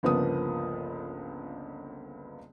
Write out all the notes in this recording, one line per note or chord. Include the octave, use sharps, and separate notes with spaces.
G1 C#2 F3 A#3 B3 D#6